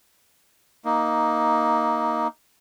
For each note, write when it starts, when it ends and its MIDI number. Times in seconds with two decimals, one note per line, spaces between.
0.85 2.28 58
0.85 2.28 63